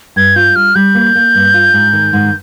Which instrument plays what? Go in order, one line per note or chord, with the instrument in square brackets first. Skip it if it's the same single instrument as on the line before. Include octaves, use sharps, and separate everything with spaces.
[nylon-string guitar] G2 [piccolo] G#6
[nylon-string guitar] F4 [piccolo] G6
[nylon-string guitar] G3 [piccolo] F6
[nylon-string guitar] G3 [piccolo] G6
[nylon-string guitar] A#3
A#3
G2
F4
G#2
D#3
G#2